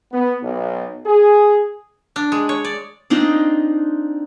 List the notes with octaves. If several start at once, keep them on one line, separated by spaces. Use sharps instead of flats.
B3
B1
G#4
D4
G#3
C#5
D5
C4 D4 D#4 F4